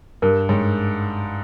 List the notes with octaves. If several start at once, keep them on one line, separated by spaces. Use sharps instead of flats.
G2 A#4
G#2 C#5 G5 C#6